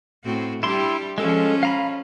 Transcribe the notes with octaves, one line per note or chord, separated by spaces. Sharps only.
A2 C4 F#4
G3 D4 E4 G4 C6
F3 G#3 C#4 A4
F5 A#5 B5